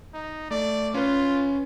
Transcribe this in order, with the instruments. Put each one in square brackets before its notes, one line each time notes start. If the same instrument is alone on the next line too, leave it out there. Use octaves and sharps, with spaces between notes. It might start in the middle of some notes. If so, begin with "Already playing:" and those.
[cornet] D#4
[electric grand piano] A3 [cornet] D5
[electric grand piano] C#4 B4 [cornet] F4